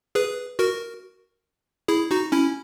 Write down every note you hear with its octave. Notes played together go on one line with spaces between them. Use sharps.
G#4 B4
F#4 A#4
E4 G#4
D#4 F#4
C#4 E4